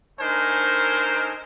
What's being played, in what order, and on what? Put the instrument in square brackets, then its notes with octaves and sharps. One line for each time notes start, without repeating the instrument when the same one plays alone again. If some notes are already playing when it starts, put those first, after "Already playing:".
[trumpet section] A3 D4 D#4 A#4 C5 G#5